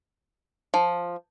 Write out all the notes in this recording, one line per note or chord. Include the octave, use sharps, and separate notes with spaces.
F3